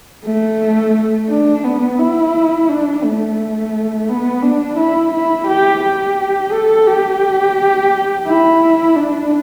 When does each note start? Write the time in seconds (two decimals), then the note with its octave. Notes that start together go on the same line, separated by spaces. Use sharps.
0.25 A3
1.29 D4
1.64 B3
1.99 E4
2.69 D4
3.03 A3
4.09 B3
4.43 D4
4.77 E4
5.13 E4
5.47 G4
5.83 G4
6.52 A4
6.88 G4
8.27 E4
8.96 D4